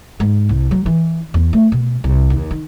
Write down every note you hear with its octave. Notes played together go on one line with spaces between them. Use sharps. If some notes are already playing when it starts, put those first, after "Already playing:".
G#2
C2
F#3
E3
E2
A3
B2
C2
D#2
D#3